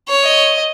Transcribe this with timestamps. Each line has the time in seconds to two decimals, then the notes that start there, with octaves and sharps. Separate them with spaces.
0.09 C#5
0.24 D#5